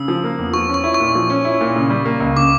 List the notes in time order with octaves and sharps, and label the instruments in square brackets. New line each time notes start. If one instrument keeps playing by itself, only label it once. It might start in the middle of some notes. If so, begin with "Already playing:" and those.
Already playing: [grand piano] C#3 [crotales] E6
[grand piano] F3
A#3
E2
[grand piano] F3 [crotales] C#6
[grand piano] C#4
[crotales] C#6
[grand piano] E4
[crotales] C#6
[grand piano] A#2
F3
C#4
E4
A#2
C#3
G3
A#3
C#2
[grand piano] C#3 [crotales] D6